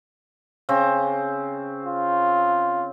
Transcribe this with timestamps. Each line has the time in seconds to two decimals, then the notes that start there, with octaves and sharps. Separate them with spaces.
0.69 C#3 C4
1.85 F4